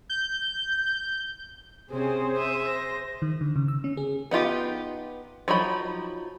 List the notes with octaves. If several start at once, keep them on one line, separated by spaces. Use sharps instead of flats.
G6
C3 C4 C#4 G#4 C5
E5 D#6
C5 A#6
D#3
D3
C#3
E6
C#4
G#4
B3 D#4 F4 G4
F3 F#3 D#4 B5